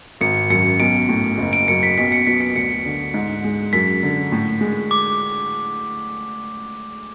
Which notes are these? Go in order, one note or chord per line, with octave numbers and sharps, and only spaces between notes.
G#1 C#7
F#2 C#7
B1 D7
A2
F#1
D7
F#2 C#7
B6
B1 B6
C#7
B2 B6
C#7
D2 C#7
D3
G#2
G#3
F#2 B6
D3
A2
G#3
D6